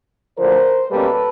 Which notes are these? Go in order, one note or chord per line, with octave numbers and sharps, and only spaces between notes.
D2 D3 F3 A#4 C5
B2 G3 A#3 C#4 A4 B4